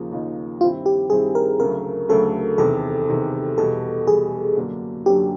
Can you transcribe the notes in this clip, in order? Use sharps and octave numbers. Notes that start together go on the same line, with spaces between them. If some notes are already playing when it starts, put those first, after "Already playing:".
Already playing: D#2 C#3 F3 A#3 D#4
D#2 C#3 F3 A#3 D#4
G2 D#3 G3 C4 E4 F4
G4
G2 D#3 G3 C4 E4 G#4
A#4
D2 C#3 F#3 A3 A#4
D2 C#3 F#3 A3 A4
E2 C3 D#3 A4
E2 C3 D#3
E2 B2 G3 A4
E2 B2 G3 G#4
F#2 D3 F#3 A#3 D4
F#2 D3 F#3 A#3 D4 G4